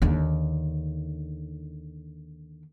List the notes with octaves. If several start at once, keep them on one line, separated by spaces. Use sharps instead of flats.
D#2 D3